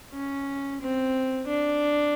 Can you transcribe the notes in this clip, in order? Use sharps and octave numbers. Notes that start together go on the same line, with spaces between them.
C#4
C4
D4